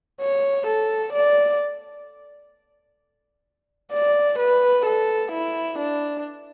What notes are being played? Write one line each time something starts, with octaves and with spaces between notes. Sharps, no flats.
C#5
A4
D5
D5
B4
A4
E4
D4